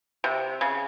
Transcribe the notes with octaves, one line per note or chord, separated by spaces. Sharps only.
C3
C#3